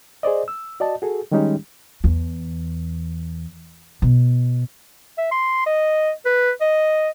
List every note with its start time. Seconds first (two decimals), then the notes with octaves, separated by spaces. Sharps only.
0.23 G#4 C5 D5 D#5
0.48 E6
0.80 F#4 D5 D#5 A5
1.02 F#4 G#4 A4
1.31 D#3 G3 G#3 C#4 D#4 G4
2.04 E2
4.02 B2
5.18 E5
5.32 C6
5.66 D#5
6.26 B4
6.61 D#5